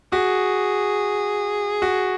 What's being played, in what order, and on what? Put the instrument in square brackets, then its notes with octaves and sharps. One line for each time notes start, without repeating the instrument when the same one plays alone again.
[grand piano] F#4 [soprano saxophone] G#4
[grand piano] F#4